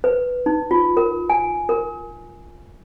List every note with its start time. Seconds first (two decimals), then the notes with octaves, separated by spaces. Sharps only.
0.04 B4
0.46 D#4
0.71 F4
0.97 A#4
1.30 G#5
1.69 A#4